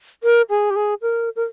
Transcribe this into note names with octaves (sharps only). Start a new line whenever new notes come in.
A#4
G#4
G4
G#4
A#4
A#4